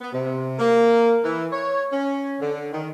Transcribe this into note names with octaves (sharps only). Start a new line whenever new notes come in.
B3
C3
A#3
E3
C#5
C#4
D3
D#3